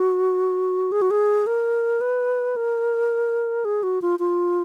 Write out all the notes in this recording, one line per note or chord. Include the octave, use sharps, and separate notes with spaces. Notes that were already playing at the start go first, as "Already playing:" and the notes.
Already playing: F#4
G#4
F#4
G#4
A#4
B4
A#4
G#4
F#4
F4
F4